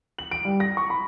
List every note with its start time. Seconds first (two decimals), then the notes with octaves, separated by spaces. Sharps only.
0.19 F#7
0.31 D7
0.45 G3
0.60 A#6
0.77 C#6
0.90 B5